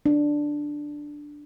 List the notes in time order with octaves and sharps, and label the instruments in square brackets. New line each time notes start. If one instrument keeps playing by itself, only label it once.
[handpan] D4